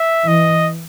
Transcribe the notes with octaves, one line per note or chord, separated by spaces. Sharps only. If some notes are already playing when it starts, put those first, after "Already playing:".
Already playing: E5
E3 D#5